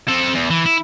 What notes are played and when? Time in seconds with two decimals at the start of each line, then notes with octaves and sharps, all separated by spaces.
0.08 C4 A4
0.35 E2
0.50 E3
0.66 E4